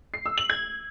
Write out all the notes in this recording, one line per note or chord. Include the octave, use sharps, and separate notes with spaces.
C7
E6
F#7
G#6